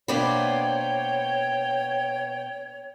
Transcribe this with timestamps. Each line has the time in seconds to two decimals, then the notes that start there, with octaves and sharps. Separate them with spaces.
0.08 B2 A#3 B3 D4 C5 C#5 G5 B5